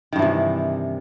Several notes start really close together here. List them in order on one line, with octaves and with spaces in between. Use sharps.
D#3 G2 E3 C3